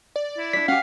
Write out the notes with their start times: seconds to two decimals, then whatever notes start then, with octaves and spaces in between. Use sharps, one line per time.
0.16 D5
0.38 E4
0.53 D4 D5 B6
0.68 C#4 G4 F5 F#5